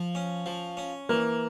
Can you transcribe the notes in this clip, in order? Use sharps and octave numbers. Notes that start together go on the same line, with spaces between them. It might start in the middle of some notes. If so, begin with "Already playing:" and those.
Already playing: F3
C#4
F3
C#4
E3 A#3